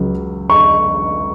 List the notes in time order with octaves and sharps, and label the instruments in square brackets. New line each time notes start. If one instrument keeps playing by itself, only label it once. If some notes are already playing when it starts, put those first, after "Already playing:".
Already playing: [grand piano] C#2 C#3 F#3
C#6